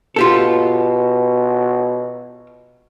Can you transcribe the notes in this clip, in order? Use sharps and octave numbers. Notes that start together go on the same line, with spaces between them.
B2 F4 G4 A4